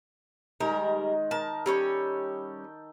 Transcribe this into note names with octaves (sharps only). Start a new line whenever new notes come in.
D#3 G3 G#3 D#4 A#4
A#4 A5
G3 C#4 A4 C#5 G5